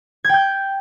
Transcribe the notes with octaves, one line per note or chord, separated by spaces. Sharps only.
G5 G6 G#6